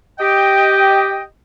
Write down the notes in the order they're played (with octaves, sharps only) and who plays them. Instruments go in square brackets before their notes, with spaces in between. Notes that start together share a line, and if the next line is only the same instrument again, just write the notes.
[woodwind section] G4 D#5 G5